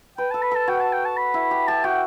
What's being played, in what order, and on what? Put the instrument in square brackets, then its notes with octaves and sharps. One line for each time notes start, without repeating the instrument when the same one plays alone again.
[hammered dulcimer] B4 [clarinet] G5
[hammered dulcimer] A4 [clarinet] A5
[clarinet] B5
[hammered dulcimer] A4 [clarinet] A5
[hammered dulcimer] F#4 [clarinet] G5
[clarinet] A5
G5
A5
B5
[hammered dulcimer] E4
G4
[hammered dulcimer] G4 [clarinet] A5
[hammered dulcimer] F#4 [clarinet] G5